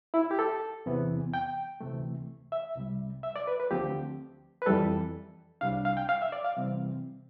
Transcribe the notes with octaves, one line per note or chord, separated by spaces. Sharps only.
E4
G4
A4
E2 C3 E3 B3
G5
D2 C3 E3 A3
E5
C2 C3 G3
E5
D5
B4
B4
D2 D3 F3 A3 C4 G4
B4
F2 E3 G3 A4
C2 C3 G3 D4 F5
F5
G5
F5
E5
D5
F5
C3 E3 G3 C4